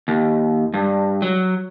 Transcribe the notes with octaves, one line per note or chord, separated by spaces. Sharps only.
D#2
G2
F#3